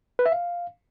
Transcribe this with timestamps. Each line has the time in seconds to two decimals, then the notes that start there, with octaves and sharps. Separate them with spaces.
0.19 B4
0.26 E5
0.32 F5